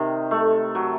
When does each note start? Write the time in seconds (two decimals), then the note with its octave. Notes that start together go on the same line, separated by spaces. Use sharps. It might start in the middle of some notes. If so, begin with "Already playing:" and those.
Already playing: C3 D#3
0.31 A3
0.75 F#3